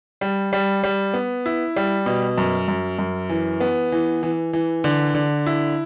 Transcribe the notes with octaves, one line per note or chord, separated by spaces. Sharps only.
G3
G3
G3
B3
E4
G3
B2
F#2
F#2
F#2
E3
B3
E3
E3
E3
D3
D3
E4